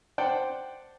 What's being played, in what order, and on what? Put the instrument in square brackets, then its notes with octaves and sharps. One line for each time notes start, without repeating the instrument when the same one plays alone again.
[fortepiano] C5 D5 F#5 G5 A5